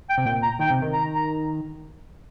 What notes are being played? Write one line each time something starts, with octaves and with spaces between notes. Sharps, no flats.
G5
C3
A#2 G5
A#5
D#3 G5
C3
D#3
A#5
A#5